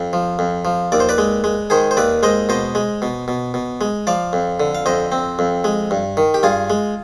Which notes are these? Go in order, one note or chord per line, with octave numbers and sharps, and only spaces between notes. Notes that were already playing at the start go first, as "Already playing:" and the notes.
Already playing: F2
F3
F2
F3
D#2 D5
C5
B4 D5
G#3
G#3
D#3 G#4 C5
C5
D#2 B4 D5
G#3 C5 D#5
B2 C5 D#5
G#3
B2
B2
B2
G#3
F3 D5 F5
F2
D3
F5
F2 C5 D#5
C4
F2
G#3
G2
D#3
G4
G2 F4 G#4
G#3